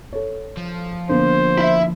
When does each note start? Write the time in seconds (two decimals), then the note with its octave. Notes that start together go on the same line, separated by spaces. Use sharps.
0.13 A4 C#5
0.57 F3
1.09 D3 A#3 B3 C5
1.58 E4 E5